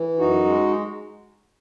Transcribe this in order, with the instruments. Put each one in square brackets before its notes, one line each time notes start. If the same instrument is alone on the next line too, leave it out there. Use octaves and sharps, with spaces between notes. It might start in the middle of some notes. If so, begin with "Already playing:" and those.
Already playing: [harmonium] E3
F#2 D#4 F#4
G#3